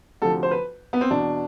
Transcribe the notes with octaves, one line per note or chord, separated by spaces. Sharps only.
D2 C3 F3 A4
C5
B4
B3
C4
E2 B2 D4